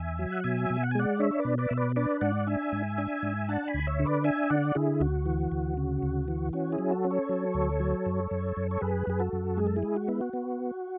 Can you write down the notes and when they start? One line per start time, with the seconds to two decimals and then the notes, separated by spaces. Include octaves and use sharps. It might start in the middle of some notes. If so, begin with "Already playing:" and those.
Already playing: E2 E5 G#5
0.19 F#3
0.32 F#5
0.44 B2 E5 G#5
0.70 B2
0.83 F#5
0.91 G#5
0.95 G#3 D5 F#5
1.20 D4 C#5 E5
1.31 C#5
1.39 B4 D5
1.45 B2
1.58 B4 D5
1.69 B2 E5
1.77 B4 D5
1.96 D4 B4 D5
2.21 G#2 D5 F#5
2.47 D4 E5 G#5
2.72 G#2
2.98 D4
3.23 G#2
3.48 D4 F#5 A5
3.67 G#5 B5
3.74 D2
3.87 C#5 E5
3.99 D3
4.05 B4 D5
4.24 D4 E5 G#5
4.50 D3 D5 F#5
4.75 D3 E4 G#4
5.00 D2 F#4
5.26 E3
5.52 D2
5.77 C#3
6.03 D2
6.28 E3
6.53 C#4 F#4
6.72 E4 G#4
6.79 F#3
6.91 F#4 A4
7.04 C#4
7.10 A4 C#5
7.29 F#3
7.54 D2
7.80 F#3
8.06 F#2
8.31 F#2
8.57 F#2
8.71 C#5
8.81 F#2 G#4 B4
9.07 F#2 G#4
9.20 F#4 A4
9.33 F#2
9.57 G#3 G#4
9.67 A4
9.76 E4 G#4
9.83 G#3
9.96 F#4
10.08 B3 E4
10.21 F#4
10.33 B3